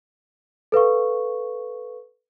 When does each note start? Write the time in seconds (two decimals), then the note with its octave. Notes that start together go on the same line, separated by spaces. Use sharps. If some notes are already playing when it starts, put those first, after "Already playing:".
0.72 A4 B4 F5 C#6